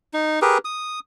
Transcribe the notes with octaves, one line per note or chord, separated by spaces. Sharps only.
D#4
G4 G#4 A#4 B4
D#6